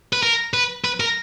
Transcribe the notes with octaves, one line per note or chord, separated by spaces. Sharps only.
B4
A#4
B4
B4
A#4